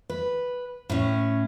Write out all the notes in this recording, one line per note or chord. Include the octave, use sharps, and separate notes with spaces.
B4
A2 C#4